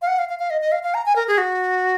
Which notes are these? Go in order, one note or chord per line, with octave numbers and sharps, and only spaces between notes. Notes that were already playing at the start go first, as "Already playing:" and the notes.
F5
F#5
F5
F5
F5
D#5
D#5
F5
F5
A#5
G#5
A#4
G#4
F#4